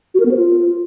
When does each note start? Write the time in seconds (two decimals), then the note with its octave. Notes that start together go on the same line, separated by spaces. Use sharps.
0.14 F#4
0.20 A#4
0.26 B3
0.31 C5
0.37 F4